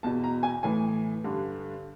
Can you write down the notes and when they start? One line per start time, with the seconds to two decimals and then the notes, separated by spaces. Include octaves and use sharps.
0.03 E2 B2 A5
0.24 A#5
0.43 G#5
0.63 A2 E3 G#5
1.24 G2 D3